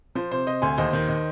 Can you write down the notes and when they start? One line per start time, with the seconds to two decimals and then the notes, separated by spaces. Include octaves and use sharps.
0.15 F3 C5
0.31 C3 C5
0.47 C3 C5 D#5
0.62 D2 G#5 C6
0.78 D#2 C5 D#5
0.93 D#3
1.09 D#3